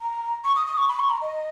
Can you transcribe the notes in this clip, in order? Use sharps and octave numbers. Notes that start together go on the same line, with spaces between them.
A#5
C#6
D#6
D#6
C#6
B5
C#6
A#5
D#5